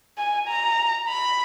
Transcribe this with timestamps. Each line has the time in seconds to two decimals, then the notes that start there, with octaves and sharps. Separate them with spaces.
0.18 G#5
0.48 A#5
1.09 B5